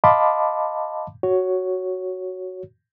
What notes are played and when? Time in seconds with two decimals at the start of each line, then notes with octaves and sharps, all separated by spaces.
0.04 D#5 F5 A5 B5 C6 D6
1.23 F#4 C#5